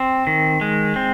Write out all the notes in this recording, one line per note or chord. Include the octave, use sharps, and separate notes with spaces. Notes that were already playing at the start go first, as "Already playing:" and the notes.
Already playing: C4
D#3
G#3
C4